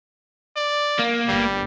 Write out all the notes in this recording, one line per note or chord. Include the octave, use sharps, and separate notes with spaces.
D5
A#3
G1 G3